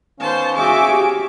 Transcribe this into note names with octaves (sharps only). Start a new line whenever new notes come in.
D#3 B3 C#4 C5 F5 A5
F#4 G#4 E5 F5 G#5 D6
G4